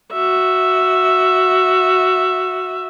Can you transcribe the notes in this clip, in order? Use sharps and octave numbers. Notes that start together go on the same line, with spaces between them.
F#4 E5